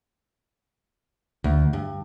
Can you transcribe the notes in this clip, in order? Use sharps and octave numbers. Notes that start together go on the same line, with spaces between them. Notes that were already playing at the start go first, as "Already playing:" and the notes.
D2
G2